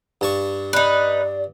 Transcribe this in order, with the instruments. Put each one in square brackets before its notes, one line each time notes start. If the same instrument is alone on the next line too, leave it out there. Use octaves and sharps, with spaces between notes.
[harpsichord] G2 A5 C#6
[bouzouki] D#4 B4 [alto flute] D5